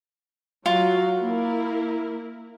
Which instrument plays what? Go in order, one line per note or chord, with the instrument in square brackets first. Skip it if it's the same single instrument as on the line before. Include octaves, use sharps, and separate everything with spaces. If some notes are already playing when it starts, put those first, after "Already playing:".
[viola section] F#3 F#4 [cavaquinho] F4
[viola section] A#3 E4 A#4